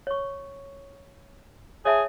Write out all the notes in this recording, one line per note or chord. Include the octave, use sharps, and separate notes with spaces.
C#5 C#6
G#4 C#5 E5 A5